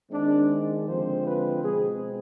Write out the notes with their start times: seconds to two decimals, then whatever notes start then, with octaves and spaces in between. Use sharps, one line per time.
0.10 D#3 G#3 C4 D4
0.87 D3 F3 G#3 C4 C5
1.25 B4
1.63 B2 G#3 C4 G#4